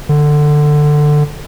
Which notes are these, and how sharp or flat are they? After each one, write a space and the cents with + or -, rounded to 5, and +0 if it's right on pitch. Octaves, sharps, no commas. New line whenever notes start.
D3 +15